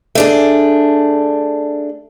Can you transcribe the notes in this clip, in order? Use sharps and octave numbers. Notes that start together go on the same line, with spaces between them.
A3 D4 G#4